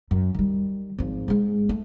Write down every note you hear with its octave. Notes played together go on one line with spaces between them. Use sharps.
F#2
D#3 G3
G#1 F3
G#2 G#3
A3